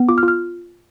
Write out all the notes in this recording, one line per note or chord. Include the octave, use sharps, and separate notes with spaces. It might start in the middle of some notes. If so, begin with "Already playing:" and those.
Already playing: B3
F4 D6
F6
F4
F6